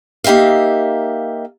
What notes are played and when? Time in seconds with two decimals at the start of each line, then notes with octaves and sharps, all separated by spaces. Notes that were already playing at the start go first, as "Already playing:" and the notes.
0.24 A#3 D#4 G4 E5 F5